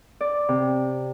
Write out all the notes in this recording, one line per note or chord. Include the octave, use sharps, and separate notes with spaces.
D5
C3